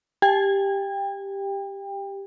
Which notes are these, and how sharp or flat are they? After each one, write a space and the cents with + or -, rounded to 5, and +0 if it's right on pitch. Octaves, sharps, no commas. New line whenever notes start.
G4 +5 G5 +25